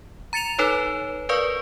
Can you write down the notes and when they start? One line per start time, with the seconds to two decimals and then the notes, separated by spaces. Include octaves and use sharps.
0.33 A#5 A6 C#7 E7 F7
0.58 D#4 A4 B4 C#5
1.29 A#4 B4 D5 F5 C#6